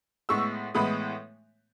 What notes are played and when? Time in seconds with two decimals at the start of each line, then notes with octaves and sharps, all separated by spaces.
0.29 A2 G#3 B3 C#6 E6
0.74 A2 E3 G#3 B3 B5 D#6